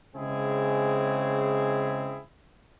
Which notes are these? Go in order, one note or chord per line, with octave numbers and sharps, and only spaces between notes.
C#3 G#3 C4 E4 G#4